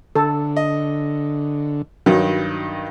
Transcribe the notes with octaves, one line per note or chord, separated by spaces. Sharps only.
D3 A4
D#5
G2 D#3 F#3